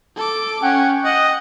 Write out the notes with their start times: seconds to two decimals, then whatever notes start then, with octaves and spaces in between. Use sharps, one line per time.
0.16 A4 D6
0.63 C#4 F#5 G5
1.05 D#5 F#5